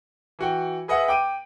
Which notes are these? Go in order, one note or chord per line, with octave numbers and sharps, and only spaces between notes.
E3 F#4 G5
G#4 B4 D#5 E5 F#5
G5 D6 D7 D#7